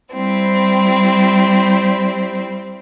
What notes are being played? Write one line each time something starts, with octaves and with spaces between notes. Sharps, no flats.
G3 C4 E4